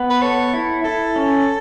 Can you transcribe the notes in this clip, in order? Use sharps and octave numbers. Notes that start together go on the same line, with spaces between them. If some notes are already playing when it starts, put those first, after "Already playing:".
Already playing: B3
B4
A4 C#5
E4
E4 A4
C#4